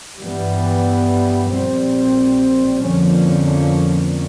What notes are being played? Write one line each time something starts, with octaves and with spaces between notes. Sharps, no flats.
G2 E3 G3 B3
A#1 A#2 G3 C4
F2 D3 F3 A#3 C#4